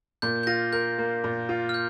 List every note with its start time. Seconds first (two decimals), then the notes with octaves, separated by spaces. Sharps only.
0.22 A#2 G6
0.43 G6
0.47 F4 A#6
0.73 A#4 G6
0.98 A#3
1.24 A#2
1.49 F4
1.69 F6
1.74 G6